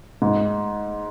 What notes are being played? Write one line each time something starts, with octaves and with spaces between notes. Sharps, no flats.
G#2